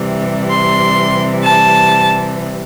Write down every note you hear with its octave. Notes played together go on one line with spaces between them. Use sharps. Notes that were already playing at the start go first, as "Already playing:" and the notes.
Already playing: C3 E3 G3
C6
A5